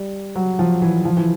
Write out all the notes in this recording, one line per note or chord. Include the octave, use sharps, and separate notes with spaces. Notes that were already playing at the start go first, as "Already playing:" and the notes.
Already playing: G3
F#3
F3
E3
F3
E3